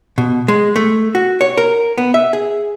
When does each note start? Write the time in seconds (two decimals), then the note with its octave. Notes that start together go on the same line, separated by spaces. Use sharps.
0.18 B2
0.48 G#3
0.76 A3
1.15 F#4
1.41 C#5
1.57 A#4
1.98 B3
2.14 E5
2.33 G#4